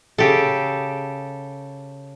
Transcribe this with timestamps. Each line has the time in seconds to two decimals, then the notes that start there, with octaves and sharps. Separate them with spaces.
0.18 C#3 G4 A4